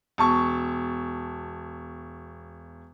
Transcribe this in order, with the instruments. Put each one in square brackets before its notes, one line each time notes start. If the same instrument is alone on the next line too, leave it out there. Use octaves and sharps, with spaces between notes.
[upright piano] E1 A5 C#6